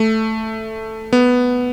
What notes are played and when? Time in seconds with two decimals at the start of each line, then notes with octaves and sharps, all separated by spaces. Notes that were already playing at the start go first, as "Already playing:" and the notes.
Already playing: A3
1.13 B3